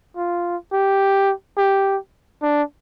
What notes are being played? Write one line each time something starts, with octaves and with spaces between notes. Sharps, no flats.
F4
G4
G4
D4